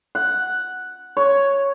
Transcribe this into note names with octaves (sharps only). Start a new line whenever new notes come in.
F#5
C#5